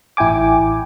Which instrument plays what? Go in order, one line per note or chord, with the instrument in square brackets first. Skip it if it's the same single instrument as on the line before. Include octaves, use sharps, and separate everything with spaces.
[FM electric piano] A1 E4 G5 G#5 D6